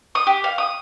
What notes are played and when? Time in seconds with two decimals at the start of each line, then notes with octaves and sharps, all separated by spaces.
0.15 D#6
0.27 G4
0.44 F5
0.58 D#6